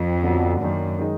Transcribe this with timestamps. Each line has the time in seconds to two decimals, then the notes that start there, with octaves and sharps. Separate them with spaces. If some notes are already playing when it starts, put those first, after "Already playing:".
Already playing: F2
0.23 D3 F#3 B3 D4
0.61 F#2 D#3 A#3 D4
0.99 D#3 G#3 D#4